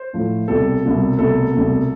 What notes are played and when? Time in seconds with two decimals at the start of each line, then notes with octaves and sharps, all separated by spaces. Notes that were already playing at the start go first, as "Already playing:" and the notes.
Already playing: C5
0.13 A2 F3 A3
0.48 C2 B2 G3 A4
0.83 C2 B2 G3
1.18 C2 B2 A3 A4
1.53 C2 B2 A3